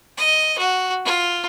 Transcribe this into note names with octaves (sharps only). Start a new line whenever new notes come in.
D#5
F#4
F4